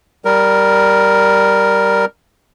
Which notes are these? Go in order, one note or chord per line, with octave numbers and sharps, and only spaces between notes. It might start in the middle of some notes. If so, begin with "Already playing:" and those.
G3 A#4